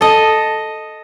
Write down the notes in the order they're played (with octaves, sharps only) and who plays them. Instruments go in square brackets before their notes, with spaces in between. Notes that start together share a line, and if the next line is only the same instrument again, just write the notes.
[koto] A4 D#5